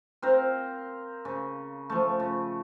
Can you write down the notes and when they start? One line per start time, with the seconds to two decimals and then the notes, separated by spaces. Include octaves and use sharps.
0.22 C4 A#4 C5 F5
1.25 C#3
1.90 F3 A3
2.20 C#3